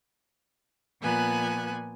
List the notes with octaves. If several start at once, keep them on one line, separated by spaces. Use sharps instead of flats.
A#2 F3 B3 G#5 F#6